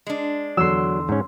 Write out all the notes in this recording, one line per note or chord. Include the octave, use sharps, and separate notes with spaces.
G#3 D4
E2 D3 F#3 C6 E6
G#2 C#4